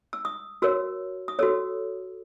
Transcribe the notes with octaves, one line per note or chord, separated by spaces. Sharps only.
E6
D#6
F#4 A#4 C#5 E6
D#6
F#4 A4 C#5 E6